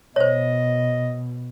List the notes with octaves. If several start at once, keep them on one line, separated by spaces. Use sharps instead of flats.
B2 C5 C#5 D#5